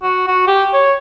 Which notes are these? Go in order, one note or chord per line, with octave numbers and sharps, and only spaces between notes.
F#4
F#4
G4
C#5